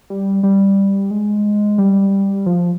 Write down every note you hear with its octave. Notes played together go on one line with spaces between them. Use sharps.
G3
G3
G#3
G3
F3